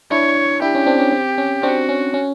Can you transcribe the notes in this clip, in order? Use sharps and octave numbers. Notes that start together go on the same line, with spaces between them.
D4 E4 C#5
D4 E4 G4
C#4
C4 D4
C#4
C4
C#4
C4 D4 F#4
C#4
C#4